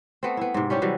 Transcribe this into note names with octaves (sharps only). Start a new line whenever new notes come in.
A3 B3 C4
B3 E4
G#2 C3
G3 C#4 E4 G4
C3 E3 F#3 G3